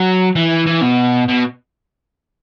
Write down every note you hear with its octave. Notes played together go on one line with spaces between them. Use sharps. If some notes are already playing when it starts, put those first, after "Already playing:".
Already playing: F#3
E3
E3
B2
B2